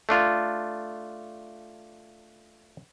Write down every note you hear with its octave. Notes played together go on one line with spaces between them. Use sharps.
A3 D4 F4